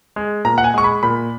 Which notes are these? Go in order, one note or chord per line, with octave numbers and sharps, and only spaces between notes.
G#3
A#2 A#5
F#5
G#5
G#3 C#6
B5
A#2 B5